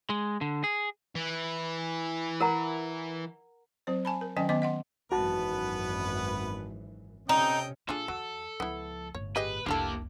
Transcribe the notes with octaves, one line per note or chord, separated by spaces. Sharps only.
G#3
D3
G#4
E3
A#4 F#5 A#5
F#3 C4 C5
G#5 A5 B5
A#4
D#3 F#3 C#4 D#5 G5 G#5
D#3 B3 D#5 G5 D6
D#5 F#5 C6
G#1 F#2 E3 B3 F#4 B4 A5
C3 C#4 D#4 A4 D#5 G5
A#2 D4 F4 G#4 A4
E2 F#3
C#2 F3 B3 E4
G1 A2 C#5
G4 G#4 B4 D#5
F1 C2 A#3 D4 E4 G4 A4